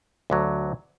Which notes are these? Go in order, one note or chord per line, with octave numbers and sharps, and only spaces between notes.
D2 D3 F#3